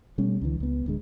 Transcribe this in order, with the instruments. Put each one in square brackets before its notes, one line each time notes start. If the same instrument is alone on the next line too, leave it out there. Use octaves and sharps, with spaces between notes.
[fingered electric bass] B2 G3 A3 C#4
C#2 D3 E3
C#2 B3
D1 D3 G#3